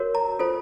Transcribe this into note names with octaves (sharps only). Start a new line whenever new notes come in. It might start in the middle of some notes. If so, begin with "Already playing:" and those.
Already playing: F#4 A#4 C#5
A#5
F4 A4 C5